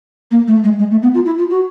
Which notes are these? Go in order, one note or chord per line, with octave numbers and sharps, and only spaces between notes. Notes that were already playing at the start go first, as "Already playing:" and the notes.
A#3
A3
G#3
G#3
A3
B3
F4
E4
F4
F#4